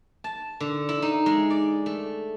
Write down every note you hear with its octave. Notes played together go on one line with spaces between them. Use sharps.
A5
D3
E4
D#4
G#3
D5
A3